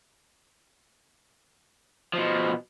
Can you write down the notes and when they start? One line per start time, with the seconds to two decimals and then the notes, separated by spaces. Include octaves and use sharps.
2.13 B2 F3